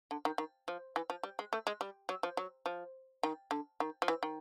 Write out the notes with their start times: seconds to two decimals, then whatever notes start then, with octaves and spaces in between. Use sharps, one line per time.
0.11 D3
0.25 D#3
0.38 D#3
0.68 F3
0.96 E3
1.10 F3
1.23 G3
1.39 G#3
1.53 A3
1.67 G#3
1.81 G3
2.09 F#3
2.23 F3
2.37 F#3
2.66 F3
3.23 D#3
3.51 D3
3.80 D#3
4.02 F3
4.08 E3
4.23 D#3